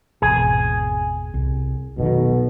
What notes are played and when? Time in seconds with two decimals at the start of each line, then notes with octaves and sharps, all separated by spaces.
0.22 G#1 E2 B2 G#4
1.34 C2
1.98 F1 B1 B2 D#3